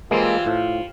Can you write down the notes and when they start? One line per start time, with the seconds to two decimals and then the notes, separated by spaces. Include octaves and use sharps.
0.11 E3 G3 G#3 A#3 C4 F4
0.46 A2 F3